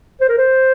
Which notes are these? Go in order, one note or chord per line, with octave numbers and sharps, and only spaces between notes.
C5
A#4
C5